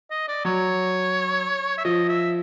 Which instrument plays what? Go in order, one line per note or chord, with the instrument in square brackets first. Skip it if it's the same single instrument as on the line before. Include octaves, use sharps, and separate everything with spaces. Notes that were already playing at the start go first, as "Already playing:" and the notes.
[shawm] D#5
D5
[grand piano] F#3 [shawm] C#5
[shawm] E5
[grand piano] F3 [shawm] D#5
[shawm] E5